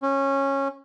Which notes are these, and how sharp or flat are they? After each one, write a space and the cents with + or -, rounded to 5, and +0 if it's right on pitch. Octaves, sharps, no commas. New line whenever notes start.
C#4 -15